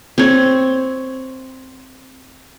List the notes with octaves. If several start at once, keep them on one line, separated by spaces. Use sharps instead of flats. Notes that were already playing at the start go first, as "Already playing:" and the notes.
C4 C#5